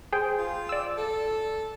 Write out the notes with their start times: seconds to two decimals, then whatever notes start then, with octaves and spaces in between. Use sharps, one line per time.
0.13 G#4 C5 G5
0.38 F4
0.69 D5 E6
0.98 A4